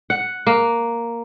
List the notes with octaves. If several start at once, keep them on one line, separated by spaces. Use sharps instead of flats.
F#5
A#3